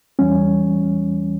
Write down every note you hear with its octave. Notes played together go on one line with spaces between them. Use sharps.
E2 E3 G3 C#4